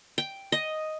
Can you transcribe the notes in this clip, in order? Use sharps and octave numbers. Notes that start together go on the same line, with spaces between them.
G5
D#5